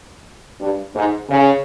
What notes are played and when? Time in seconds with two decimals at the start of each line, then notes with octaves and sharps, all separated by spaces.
0.60 G2
0.95 G#2
1.29 C#3